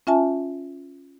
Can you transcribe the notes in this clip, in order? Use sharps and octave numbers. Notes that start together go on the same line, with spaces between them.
C#4 F4 E5 G#5 A5